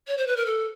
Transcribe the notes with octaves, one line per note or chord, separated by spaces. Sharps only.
C#5
C5
B4
A#4
A4